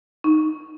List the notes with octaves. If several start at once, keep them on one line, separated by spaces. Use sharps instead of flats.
D#4